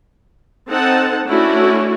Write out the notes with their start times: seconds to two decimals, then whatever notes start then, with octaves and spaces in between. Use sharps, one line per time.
0.69 C4 D#4 A4 F#5 A5
1.26 A3 C#4 D4 E4 F#4